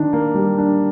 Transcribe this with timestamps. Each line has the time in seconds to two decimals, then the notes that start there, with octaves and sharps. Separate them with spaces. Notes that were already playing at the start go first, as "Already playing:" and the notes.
Already playing: D#3 D4
0.13 A#3
0.35 G3
0.58 D4